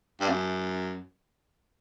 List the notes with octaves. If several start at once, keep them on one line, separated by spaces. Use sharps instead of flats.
G2
F#2